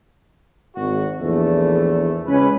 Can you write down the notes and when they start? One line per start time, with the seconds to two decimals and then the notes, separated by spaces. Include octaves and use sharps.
0.75 G#1 F#4
1.19 A#1 E2 A3
2.26 C#2 C#4 B4